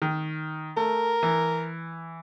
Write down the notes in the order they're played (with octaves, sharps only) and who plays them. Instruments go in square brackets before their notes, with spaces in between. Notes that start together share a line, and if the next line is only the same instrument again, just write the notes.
[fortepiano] D#3
[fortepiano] A3 [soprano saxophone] A#4
[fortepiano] E3